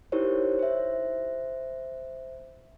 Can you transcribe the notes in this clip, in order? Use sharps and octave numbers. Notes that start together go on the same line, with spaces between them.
D#4 E4 G4 A#4 C5 C#5
C5 E5